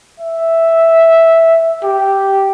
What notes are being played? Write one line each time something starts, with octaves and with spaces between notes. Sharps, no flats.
E5
G4